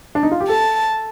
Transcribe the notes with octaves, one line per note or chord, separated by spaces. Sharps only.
D4
D#4
F4
G4
A4 A5